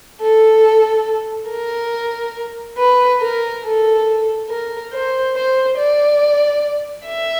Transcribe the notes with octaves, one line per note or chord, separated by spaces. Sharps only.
A4
A#4
B4
A#4
A4
A#4
C5
C5
D5
E5